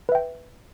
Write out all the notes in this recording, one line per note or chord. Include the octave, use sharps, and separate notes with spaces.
B4 E5 G5